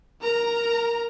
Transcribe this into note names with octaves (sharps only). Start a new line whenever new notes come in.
A#4 A#5